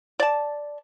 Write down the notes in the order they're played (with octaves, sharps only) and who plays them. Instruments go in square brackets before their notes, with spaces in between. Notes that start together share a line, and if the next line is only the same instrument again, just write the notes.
[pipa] D5 A5